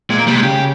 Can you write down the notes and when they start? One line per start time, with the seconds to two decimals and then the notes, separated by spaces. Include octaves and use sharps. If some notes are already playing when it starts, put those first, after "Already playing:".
0.10 A#2 G#3
0.18 A#3
0.27 C3 G3
0.35 D#3 G#3
0.42 C#3 G4